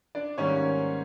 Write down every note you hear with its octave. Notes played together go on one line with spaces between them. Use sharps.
D4 D5
G#2 D#3 G3 A#3 C#4 C#5